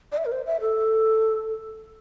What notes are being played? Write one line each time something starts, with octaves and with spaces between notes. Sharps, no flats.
D5
E5
A#4
C5
E5
A4